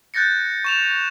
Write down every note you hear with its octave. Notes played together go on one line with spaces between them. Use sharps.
F#6 G6 A6 A#6 C#7
C#6 E7 F7